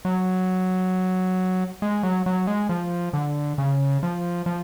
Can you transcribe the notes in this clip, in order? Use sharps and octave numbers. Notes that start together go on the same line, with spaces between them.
F#3
G#3
F#3
F#3
G#3
F3
D3
C#3
F3
F3